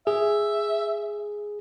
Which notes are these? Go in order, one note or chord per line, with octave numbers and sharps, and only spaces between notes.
G#4 E5